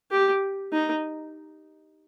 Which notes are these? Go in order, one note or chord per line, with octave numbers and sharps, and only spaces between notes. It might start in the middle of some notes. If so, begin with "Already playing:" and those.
G4
D#4